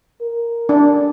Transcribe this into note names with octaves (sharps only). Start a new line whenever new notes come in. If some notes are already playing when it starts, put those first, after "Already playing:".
A#4
D4